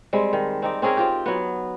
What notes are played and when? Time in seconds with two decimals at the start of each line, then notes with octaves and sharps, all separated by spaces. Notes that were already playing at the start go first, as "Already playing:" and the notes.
0.13 G3 G#3 C4
0.33 D#3
0.62 C4 D#4 D5
0.82 C4 C#4 G#4 A#4
0.97 C4 F4 G4
1.26 F#3 B3